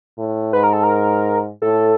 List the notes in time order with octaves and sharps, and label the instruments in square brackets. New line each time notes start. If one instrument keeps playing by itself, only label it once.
[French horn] A2
[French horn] G#2 [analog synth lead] B4
[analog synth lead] A#4
A4
A#4
[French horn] A2 [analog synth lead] A4